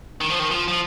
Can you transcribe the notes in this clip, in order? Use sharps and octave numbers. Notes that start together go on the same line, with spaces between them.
D#3
F3
D#3
F3
F3